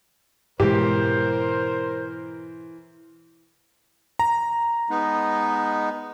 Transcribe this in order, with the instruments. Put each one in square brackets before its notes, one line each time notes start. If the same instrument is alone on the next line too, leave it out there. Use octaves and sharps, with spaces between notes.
[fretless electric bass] G#2 B2 G#3 [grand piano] E3 [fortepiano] G4 [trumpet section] A#4 C5
[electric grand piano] A#5
[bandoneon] G#3 B3 D#4